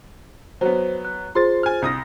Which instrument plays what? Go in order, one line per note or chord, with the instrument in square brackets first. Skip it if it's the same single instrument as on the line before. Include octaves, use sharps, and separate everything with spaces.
[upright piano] F#3 B3 [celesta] C5
[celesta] F#6
[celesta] F4 G#4 C5 [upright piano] C6 A6
[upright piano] G#5 F6
C2 D#6 A#6